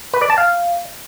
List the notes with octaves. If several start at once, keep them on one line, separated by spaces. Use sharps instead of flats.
B4
D5
A5
F5